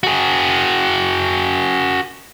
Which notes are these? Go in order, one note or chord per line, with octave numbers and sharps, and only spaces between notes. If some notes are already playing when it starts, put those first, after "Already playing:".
F#4 G#4